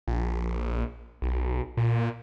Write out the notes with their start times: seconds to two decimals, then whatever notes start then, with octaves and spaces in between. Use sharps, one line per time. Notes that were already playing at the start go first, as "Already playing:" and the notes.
0.08 A#1
1.22 B1
1.77 A#2